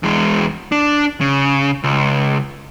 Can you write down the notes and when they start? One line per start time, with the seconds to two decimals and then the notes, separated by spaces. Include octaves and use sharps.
0.03 E2 G#3
0.72 D4
1.21 C#3
1.84 C#2